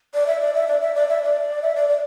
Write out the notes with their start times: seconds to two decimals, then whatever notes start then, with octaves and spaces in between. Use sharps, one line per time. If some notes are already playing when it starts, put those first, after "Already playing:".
0.14 D5
0.27 E5
0.41 D5
0.54 E5
0.67 D5
0.81 E5
0.95 D5
1.08 E5
1.22 D5
1.62 E5
1.75 D5
1.89 D5